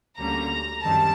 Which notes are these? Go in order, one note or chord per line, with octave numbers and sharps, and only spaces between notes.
D2 D3 G3 A#3 C#4 A#5
F#2 D#3 G3 C4 A5